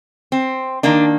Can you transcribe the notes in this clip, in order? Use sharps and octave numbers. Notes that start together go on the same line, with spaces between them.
C4
D#3 A#3 D4